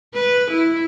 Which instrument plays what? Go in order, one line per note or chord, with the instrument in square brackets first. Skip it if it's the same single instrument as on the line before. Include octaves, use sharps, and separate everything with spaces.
[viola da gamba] B4
E4